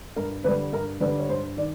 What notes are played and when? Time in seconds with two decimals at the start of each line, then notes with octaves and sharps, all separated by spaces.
0.16 G2 A#4
0.44 D3 G3 B4
0.73 G2 A#4
1.00 D3 G3 B4
1.19 C#5
1.29 G2 C5
1.57 D#3 D5